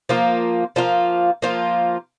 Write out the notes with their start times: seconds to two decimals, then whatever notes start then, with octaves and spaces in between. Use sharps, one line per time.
0.09 F3 A#3 F4
0.76 F3 A#3 F4
1.42 F3 A#3 F4